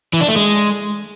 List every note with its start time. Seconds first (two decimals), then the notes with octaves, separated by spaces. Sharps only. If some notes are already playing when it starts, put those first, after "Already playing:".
0.13 E3
0.21 D4
0.29 A3
0.36 G#3